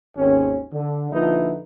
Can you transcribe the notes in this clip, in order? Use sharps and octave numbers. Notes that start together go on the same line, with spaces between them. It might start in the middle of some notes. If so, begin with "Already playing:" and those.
G#1 D#2 C4 C#4
D3
A#1 D3 F3 D#4 E4 B4